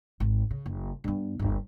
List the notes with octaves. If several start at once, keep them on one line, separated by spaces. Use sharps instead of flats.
G#1
C#3
F#1
G2 B3
G1 D#2